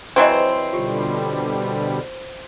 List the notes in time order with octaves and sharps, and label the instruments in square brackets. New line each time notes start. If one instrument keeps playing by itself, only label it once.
[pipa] E3 F#3 C4 [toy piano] G#4 B4 D#5 [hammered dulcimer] C5
[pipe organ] B2 D3 G3 [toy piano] F4 G4